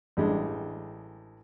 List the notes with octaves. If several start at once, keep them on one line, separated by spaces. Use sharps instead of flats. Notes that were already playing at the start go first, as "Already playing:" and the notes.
A1 G3 G#3 D4